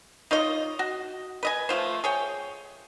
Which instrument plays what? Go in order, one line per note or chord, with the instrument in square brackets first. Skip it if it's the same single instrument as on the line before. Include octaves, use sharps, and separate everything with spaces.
[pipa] D#4 F4 C#5 D#5
F#4
B4 D#5 G#5
F3 A3 F4 C5
G#4 C#5 G5